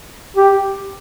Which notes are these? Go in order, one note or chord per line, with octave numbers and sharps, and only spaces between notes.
G4